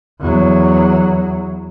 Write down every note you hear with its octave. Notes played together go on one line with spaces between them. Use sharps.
E2 F#3